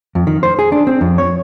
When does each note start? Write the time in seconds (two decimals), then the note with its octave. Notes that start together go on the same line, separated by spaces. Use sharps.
0.15 F2
0.27 D#3
0.43 C5
0.59 G#4
0.72 D4
0.87 C4
1.01 F2
1.18 C#5